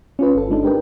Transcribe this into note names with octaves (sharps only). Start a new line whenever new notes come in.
C#4 F4 B4
G1 A4
G#3 D4 D#4 A4
G4 A#4 B4 G5